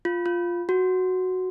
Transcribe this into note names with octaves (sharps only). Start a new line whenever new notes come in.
F4
F4
F#4